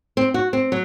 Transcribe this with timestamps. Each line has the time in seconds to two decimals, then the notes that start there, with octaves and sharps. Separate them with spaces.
0.17 C4
0.34 F#4
0.53 C4
0.72 F#3